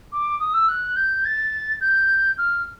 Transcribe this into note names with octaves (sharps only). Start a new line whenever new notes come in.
D6
D#6
E6
F#6
G6
A6
G6
F6